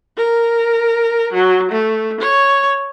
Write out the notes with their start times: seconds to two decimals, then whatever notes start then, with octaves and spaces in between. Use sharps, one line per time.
0.17 A#4
1.33 F#3
1.71 A3
2.20 C#5